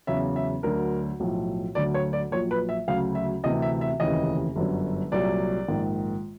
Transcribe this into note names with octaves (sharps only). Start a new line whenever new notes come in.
E2 C#3 F#3 E5
E5
D2 D3 F#3 A#4
B1 A2 F3
D2 D3 F#3 D5
C#5
D5
A#1 A#2 F#3 C#5
B4
E5
D2 C#3 F#3 F5
E5
D2 C3 E3 D#5
E5
E5
F1 D#2 C#3 E3 D#5
G1 F#2 D3 F#3
C2 A#2 F#3 D5
A#1 G#2 D#3